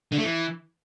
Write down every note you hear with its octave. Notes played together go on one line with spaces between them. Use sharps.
D3
A3
E3